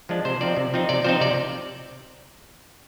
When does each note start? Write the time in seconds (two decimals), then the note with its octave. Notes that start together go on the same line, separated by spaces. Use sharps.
0.09 F3 G#3 D4
0.25 C3 C5
0.41 F3 C4 D#4 D5
0.57 C3
0.74 F3 C4 D#4
0.89 C3 D5
1.04 F3 C4 D#4 C5
1.21 C3 D5